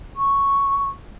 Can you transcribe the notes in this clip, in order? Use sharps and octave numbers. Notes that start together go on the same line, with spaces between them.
C#6